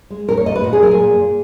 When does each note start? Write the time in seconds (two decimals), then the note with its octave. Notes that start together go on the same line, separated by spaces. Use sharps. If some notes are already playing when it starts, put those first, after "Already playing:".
0.10 G#3
0.28 A#2 A#4
0.37 C#5
0.46 A#2 D#5
0.55 B4
0.64 A#2 F#4
0.73 G#4
0.82 F#3 A#4
0.91 G#4
1.00 A#2
1.19 A#2